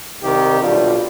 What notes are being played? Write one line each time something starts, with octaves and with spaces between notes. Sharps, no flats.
C2 C3 D#3 G3 D#4 G4
B1 B2 G3 D4 F4